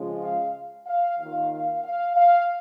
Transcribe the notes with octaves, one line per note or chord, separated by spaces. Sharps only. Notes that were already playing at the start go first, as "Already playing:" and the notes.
Already playing: C#3 F3 G#3 C#4 F4
F5
F5
D#2 D#3 A#3 F4 F5
F5
F5
F5